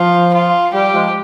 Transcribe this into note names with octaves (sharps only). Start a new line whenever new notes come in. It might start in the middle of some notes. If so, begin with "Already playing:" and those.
Already playing: F3 F4
F4
G3 G4
F3 G#3